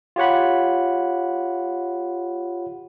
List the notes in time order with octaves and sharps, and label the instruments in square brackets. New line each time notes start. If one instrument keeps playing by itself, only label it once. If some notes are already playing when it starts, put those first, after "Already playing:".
[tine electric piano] F4 G4 C#5 F#5 B5